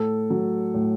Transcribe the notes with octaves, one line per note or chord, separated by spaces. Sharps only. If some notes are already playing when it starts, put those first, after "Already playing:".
Already playing: A2 A4
F#3
A2